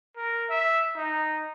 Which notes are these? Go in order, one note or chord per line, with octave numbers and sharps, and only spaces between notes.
A#4
E5
D#4